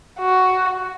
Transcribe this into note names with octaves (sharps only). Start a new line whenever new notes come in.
F#4